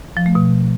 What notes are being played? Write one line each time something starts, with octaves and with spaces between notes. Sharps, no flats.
F3
A3
B2